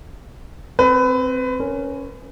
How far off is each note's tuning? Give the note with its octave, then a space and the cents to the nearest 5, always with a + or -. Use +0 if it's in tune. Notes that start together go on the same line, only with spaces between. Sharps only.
C4 +0 B4 +25
C#4 +0 A#4 +0